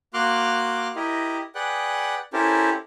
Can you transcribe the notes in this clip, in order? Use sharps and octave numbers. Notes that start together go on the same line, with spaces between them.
A#3 F#4 C6 D6 F6 F#6
E4 G4 A#4 D#5
G#4 B4 D5 F#5 G5 F#6
C#4 E4 G4 A4 A#4 C5